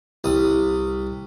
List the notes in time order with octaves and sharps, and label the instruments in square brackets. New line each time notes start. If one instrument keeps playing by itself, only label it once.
[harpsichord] C2 D#6